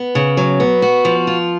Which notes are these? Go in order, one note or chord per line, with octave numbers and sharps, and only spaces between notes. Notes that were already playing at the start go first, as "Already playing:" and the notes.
Already playing: B3
C#3
F#3
B3
F#4
F3
F4